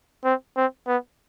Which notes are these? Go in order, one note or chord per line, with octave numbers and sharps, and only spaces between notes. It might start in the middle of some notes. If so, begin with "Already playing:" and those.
C4
C4
B3